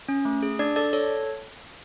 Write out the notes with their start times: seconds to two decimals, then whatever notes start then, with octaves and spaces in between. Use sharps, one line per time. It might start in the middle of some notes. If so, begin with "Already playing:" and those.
0.08 C#4
0.25 A3
0.43 G#4
0.59 D4 D5
0.76 A4 D5
0.93 A4 C#5